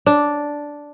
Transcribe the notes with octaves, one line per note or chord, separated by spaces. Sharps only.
D4